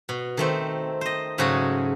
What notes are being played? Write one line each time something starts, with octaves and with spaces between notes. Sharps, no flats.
B2
D#3 A3 C4
C5 D#5
G#2 C#3 F#3 A3 F#4 G#4